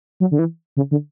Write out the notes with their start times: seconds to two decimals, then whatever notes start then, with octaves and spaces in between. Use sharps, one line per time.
0.20 F#3
0.31 D3
0.39 E3
0.77 C#3
0.91 D3